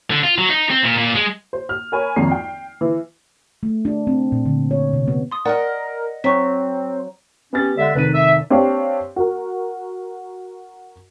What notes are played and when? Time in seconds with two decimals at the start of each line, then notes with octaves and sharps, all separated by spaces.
0.11 D3
0.24 F4
0.38 F#3
0.50 D#4
0.70 C4
0.84 A#2
0.98 A#2
1.15 G#3
1.53 C5
1.69 F6
1.92 A#4 C#5 G#5 B5
2.16 G#1 F2 A#5 C7
2.31 G5
2.81 E3
3.63 A3
3.85 D4
4.07 C4
4.32 A#2
4.46 D3
4.71 C#5
4.93 C3
5.08 B3
5.31 C6 D#6
5.45 A#4 D5 D#5 F#5
6.24 F#3 C4 C#6 B6
7.53 B3 C#4 G4 A6
7.77 D3 G#3 D5 E5 F#5
7.95 F1 D#3 B4 D#7
8.14 E5
8.50 C4 D4 G4 C#5 F5
9.16 F#4 A#4